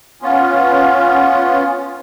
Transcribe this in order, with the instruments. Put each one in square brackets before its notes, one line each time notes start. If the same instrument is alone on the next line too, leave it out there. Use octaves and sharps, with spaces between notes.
[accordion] B3 C#4 F4